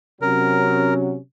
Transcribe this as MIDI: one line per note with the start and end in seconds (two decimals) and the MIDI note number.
0.22 1.15 48
0.22 1.15 54
0.22 1.15 61
0.22 0.94 70